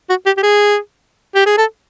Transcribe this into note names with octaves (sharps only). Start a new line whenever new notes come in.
F#4
G4
G4
G#4
G4
G#4
A4